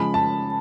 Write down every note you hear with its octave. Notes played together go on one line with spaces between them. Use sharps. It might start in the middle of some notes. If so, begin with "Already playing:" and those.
Already playing: C#3 F3 G#3 B5
A5